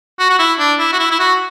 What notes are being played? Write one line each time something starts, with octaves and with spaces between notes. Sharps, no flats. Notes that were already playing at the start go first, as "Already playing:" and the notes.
F#4
F#4
E4
D4
E4
F#4
E4
E4
F#4